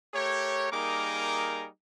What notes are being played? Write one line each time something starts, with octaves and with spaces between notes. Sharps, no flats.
A3 G4 A#4 C#5
G3 A#3 D#4 G#4 A#4 D6